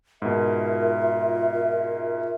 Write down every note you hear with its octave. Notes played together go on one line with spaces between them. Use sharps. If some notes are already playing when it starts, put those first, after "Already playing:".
G#2 B2 F4 A#4 E5